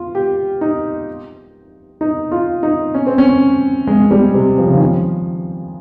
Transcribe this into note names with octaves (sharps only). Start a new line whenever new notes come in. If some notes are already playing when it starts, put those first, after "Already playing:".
Already playing: F4
G4
D#4
D#4
F4
D#4
C#4
C4
C#4
G#3
G3
C3
F3
C#3
D#3
F3